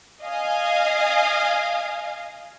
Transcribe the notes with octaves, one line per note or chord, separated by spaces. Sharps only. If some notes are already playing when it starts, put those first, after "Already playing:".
D#5 F5 G#5